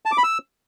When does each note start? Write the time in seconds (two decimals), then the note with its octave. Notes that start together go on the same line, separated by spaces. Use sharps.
0.05 A5
0.12 D6
0.18 B5
0.24 E6